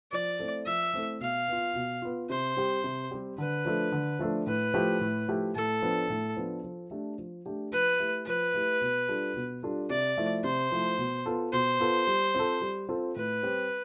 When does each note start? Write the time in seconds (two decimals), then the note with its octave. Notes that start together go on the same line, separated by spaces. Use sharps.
0.12 F3 D5
0.39 A3 C4 E4 A4
0.66 F3 E5
0.94 A3 C4 E4 A4
1.20 B2 F5
1.48 B3 F4
1.75 B2
2.02 B3 F4
2.30 C3 C5
2.56 G3 C4 G4
2.84 C3
3.11 G3 C4 G4
3.38 D3 B4
3.65 F3 A3 D4 A4
3.92 D3
4.19 F3 A3 D4 A4
4.47 A2 B4
4.74 F3 A3 E4 G4
5.01 A2
5.28 F3 A3 E4 G4
5.55 A2 A4
5.82 F3 B3 D4
6.10 A2
6.36 F3 B3 D4
6.64 F3
6.91 A3 D4 G4
7.19 F3
7.46 A3 D4 G4
7.72 F3 B4
8.00 A3 E4 G4
8.26 F3 B4
8.54 A3 E4 G4
8.81 B2
9.08 G3 D4 F4 A4
9.36 B2
9.63 G3 D4 F4 A4
9.90 C3 D5
10.18 F3 A3 E4
10.44 C3 C5
10.71 F3 A3 E4
10.98 B2
11.26 B3 F4 A4
11.52 B2 C5
11.80 B3 F4 A4
12.07 G3
12.35 C4 F4 A4
12.61 G3
12.89 C4 F4 A4
13.16 A2 B4
13.43 G3 C4 G4